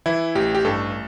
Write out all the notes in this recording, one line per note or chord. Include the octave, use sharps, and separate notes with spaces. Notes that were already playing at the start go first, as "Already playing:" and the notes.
E3 E4
A1 G4
G4
G2 A4